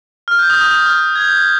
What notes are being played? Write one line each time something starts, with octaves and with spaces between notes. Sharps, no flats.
F6
G6
D#6
D#6
D#6
F6
G#6
G6
G#6